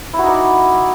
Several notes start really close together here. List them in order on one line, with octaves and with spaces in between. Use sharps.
E4 F#4 D#4 D5